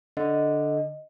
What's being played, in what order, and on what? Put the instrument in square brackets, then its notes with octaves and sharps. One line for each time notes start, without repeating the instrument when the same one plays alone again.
[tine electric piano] D3 [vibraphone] D#5